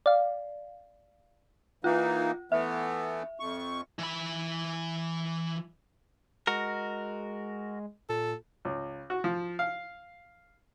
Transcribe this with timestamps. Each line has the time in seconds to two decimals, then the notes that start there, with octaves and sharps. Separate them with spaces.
0.06 D5 F5
1.84 E3 A#3 D#4 F4
2.52 E3 A3 B3 E5
3.40 F2 C#6
3.99 E3 B5
6.47 G#3 F#4 A#4
8.09 A#2 A4
8.65 C#2
9.10 F#4
9.24 F3
9.59 F5